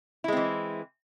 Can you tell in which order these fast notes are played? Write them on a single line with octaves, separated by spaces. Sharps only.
E4 G#3 C4 E3